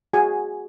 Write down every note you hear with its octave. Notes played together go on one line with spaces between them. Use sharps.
F#4 G#4 G#5